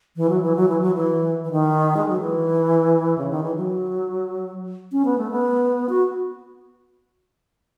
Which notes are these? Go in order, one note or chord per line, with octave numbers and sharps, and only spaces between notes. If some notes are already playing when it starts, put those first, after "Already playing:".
E3
F#3
E3
F#3
E3
F#3
E3
E3
D#3
G#3
F#3
E3
C#3
D#3
E3
F#3
C#4
B3
A3
B3
F#4